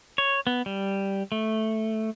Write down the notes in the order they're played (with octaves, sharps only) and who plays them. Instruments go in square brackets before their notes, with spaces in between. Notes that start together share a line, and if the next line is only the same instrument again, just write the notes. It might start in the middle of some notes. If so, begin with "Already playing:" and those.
[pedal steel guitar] C#5
B3
G3
A3